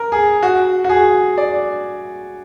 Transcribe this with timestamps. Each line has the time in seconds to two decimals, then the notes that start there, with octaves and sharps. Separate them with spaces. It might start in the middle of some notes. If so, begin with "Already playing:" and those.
Already playing: A#4
0.12 G#4
0.43 F#4
0.84 F#4
0.89 G#4
1.38 D5